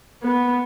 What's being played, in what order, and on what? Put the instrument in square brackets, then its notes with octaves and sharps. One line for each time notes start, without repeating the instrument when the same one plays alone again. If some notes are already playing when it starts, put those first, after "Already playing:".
[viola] B3